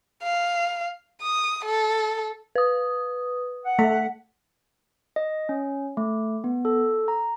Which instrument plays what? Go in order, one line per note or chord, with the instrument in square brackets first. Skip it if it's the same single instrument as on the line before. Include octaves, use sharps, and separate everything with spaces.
[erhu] F5
D#6
A4
[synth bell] B4 D#6
[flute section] F#5
[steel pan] A3 [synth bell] B6
[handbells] D#5
C#4
A3
B3
A4
A#5